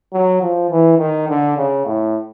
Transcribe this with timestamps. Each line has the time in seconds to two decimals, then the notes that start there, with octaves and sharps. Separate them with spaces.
0.13 F#3
0.41 F3
0.70 E3
0.98 D#3
1.28 D3
1.57 C#3
1.86 A2